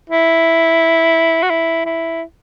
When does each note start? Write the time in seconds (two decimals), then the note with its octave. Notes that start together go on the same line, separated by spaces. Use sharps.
0.10 E4
1.43 F#4
1.50 E4
1.85 E4